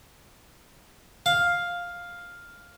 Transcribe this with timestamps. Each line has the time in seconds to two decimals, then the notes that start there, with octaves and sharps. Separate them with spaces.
1.26 F5